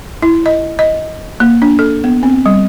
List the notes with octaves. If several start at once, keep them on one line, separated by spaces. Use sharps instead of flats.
E4
D#5
D#5
A#3
D4
A4
B3
C4
G3